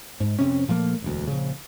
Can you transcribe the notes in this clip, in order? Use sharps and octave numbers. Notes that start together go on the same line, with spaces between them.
G#2
F1 C3 C#4
A#2 F3 A3 A#3
E1 D2
A#1 C#3